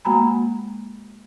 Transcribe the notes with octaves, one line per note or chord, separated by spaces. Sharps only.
G#3 A#3 F#4 G#5 A#5 B5